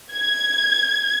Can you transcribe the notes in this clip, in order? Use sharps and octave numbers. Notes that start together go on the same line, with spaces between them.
G#6